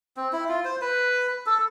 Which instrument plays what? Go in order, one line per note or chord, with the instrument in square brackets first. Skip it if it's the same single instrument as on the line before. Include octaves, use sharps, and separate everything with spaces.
[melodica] C4
E4
F4
C5
B4
A4